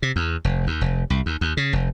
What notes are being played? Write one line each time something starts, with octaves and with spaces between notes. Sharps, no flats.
C3
E2
F1
D#2
F1
C2
D#2
D#2
C#3
F1